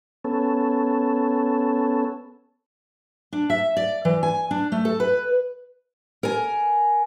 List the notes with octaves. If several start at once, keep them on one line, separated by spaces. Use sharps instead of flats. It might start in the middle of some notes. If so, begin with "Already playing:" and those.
B3 C#4 A4
D4
E5
D5
E3
G#5
D4
A3
A4
B4
A#4 G#5